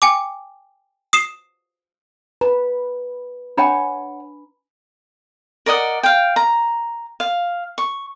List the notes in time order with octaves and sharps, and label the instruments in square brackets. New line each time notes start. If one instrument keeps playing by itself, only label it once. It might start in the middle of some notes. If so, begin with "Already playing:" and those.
[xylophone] G5 G#5 D6
D#6 C7 E7
[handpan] B4 [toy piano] A#5
[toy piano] D4 A#5 B5 [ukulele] C#5 F#5 G#5
[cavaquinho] A#4 D5 D#5 F#5
F5 G5
A#5
F5
C#6